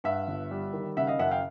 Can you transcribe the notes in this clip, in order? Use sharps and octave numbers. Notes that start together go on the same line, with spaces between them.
G2 E5 F#5
G1
G3
D#3
C#3 E5 F#5
D#5 F5
F#2 E5 F#5
F5 G5